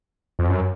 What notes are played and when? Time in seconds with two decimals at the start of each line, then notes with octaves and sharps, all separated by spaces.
0.39 F2
0.49 F#2